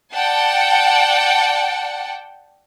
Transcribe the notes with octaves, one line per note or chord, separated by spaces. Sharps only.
D5 F#5 G5 A5